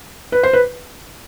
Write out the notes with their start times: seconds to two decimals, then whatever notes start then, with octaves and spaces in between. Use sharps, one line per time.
0.32 B4
0.43 C5
0.53 B4